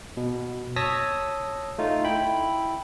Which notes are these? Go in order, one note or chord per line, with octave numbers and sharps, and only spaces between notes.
B2
C#5 A5 D#6 E6 A#6 B6
A3 D#4 F4
E4 G5 B5